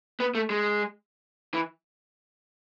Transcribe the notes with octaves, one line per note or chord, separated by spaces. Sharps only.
B3
A3
G#3
E3